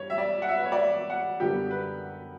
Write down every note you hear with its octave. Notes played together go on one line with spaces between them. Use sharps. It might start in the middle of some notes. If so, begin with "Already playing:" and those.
Already playing: G2 E3 C#5
E5
D5
F#5
E5
B4
C#5
D5
E5
F#5
F#2 D3 G3 B3 G4
B4